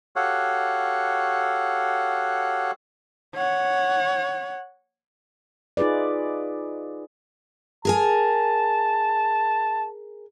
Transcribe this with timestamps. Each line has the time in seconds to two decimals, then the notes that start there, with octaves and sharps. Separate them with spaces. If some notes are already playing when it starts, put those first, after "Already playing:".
0.16 F#4 G4 A4 C#5 F5 F#5
3.35 C#5 F#5
5.77 D#4 F4 G#4 B4 D5
7.85 G#4 A#4 G#5 A5